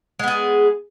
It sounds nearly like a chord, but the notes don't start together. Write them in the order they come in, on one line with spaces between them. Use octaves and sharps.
G#3 B3 G#4